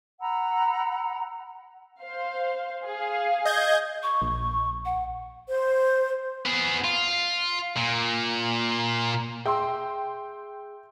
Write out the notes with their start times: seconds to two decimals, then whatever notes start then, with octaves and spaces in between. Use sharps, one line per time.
0.20 F#5 A#5 B5 E6
2.02 C5 F5
2.85 G#4 F5
3.45 D#5 G6 G#6
4.03 C#6
4.22 A#1
4.85 F#5
5.48 C5
6.45 B3 G#4
6.84 F4
7.77 A#2
9.46 G#4 E5 G5 C6 E6